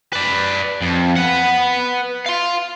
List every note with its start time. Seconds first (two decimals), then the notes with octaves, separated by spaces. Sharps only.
0.13 B4 D5
0.82 F2
1.17 B4 F#5
2.26 F5 C6